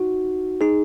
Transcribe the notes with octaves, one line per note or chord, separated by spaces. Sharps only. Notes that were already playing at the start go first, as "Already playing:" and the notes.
Already playing: D#4 F#4
D#4 G#4